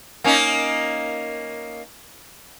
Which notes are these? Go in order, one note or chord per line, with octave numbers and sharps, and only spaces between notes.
A#3 C#4 D#4